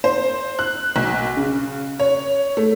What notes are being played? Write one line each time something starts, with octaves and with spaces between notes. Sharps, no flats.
C5
F#6
B1
C#3
C#5
A3